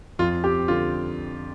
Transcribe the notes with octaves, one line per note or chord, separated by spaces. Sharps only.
F2 F4
C4 G4
D3 F4